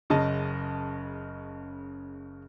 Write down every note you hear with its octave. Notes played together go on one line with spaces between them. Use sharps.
F#1 C#3 D#5 A5